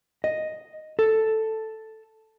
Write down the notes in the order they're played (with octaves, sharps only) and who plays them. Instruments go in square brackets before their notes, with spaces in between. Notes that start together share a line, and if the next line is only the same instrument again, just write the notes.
[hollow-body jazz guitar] D#5
A4